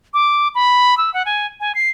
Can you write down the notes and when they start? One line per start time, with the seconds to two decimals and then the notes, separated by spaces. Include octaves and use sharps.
0.14 D6
0.55 B5
0.98 E6
1.14 F#5
1.26 G#5
1.60 G#5
1.75 C7